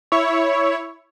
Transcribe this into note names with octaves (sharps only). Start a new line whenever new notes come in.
E4 C#5